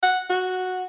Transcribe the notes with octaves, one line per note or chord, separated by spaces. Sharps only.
F#5
F#4